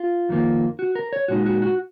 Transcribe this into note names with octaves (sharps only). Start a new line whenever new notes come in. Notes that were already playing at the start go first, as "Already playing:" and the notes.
Already playing: F4
F2 D#3 A#3 F4
F#4
A#4
C#5
A#2 G#3 D#4 F#4
F#4
F#4